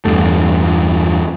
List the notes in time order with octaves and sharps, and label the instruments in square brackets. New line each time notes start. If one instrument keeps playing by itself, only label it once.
[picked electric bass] E2 G2 A3